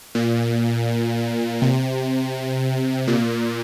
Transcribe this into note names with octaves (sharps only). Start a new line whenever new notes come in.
A#2
C3
A#2